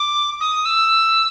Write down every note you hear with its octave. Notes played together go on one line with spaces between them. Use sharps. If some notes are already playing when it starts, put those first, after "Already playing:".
Already playing: D6
D#6
E6